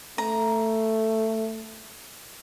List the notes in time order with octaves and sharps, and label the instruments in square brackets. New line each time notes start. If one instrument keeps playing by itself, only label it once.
[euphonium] A3 [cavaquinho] A#5